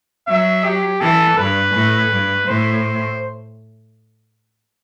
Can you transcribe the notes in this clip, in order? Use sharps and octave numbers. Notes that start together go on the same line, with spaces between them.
F#3 E5
G4
E3 A4
G2 B4
A2
G2
A2 C5